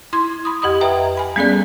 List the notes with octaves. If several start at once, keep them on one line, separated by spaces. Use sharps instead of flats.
E4 C6 G#6
B5 D#6
F2 G4 D#5 B5 D#6
B4 E5 G5 A#5
G#5 B5
G3 B3 C#4 G#4 A4 D5